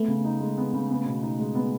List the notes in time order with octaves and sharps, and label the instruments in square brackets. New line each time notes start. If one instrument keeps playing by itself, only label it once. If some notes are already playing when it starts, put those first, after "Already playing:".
Already playing: [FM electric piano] A3 [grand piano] B3
[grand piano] C#3
D#4
G#3
B3
C#3
B3
B2
D#4
G#3
B3